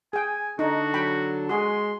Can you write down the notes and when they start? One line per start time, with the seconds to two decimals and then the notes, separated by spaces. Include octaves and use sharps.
0.13 G#4 G5 G#5
0.59 D3 D4 D#4 F#4 A4
0.94 F#3 G5 B5
1.49 G#3 F#4 G#4 C6